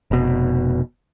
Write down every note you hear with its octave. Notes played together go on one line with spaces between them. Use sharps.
F1 B2